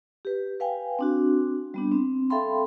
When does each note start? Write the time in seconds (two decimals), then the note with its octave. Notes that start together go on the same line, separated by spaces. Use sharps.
0.25 G4 B4
0.60 B4 F5 G5 G#5
0.99 C4 D4 F#4
1.74 G3 B3 D4
1.92 C4
2.30 A4 E5 F5 G5 B5 C6